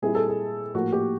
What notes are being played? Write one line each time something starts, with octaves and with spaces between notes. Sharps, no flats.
A#2 G3 C4 E4 G#4
A4
G#4
A2 F3 A#3 F#4
G4